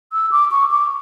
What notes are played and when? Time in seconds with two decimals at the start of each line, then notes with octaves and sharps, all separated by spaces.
0.13 E6
0.31 D6
0.52 C#6
0.71 D6